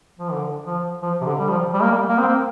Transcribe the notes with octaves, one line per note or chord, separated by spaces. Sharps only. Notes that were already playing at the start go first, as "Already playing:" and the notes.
F3
D3
F3
F3
C3
D3
G3
F3
G3
A#3
G3
A#3
C4
A#3